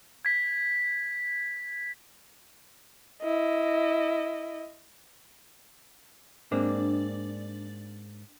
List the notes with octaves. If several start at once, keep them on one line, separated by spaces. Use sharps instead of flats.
G#6 B6
E4 D#5
G#2 A#3 C4 D4